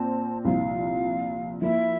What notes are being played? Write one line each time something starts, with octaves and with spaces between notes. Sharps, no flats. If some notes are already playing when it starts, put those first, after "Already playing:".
Already playing: A#2 C4 A5
C2 A#2 F3 F5
F3 A#3 E4 E5